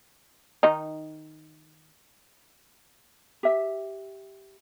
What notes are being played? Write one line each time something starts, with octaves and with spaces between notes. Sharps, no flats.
D#3 D#4
G4 E5